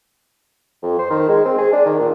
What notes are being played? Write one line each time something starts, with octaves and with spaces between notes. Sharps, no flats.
F2
C5
D#3
G#3
C4
G#4
D4
D#3
A#2